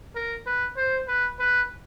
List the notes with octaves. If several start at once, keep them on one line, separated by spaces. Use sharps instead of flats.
A#4
B4
C5
B4
B4